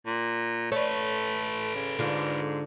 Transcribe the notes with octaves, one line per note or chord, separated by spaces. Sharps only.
A#2
A3 A4 B4 C#5
C#3
G#2 D3 F4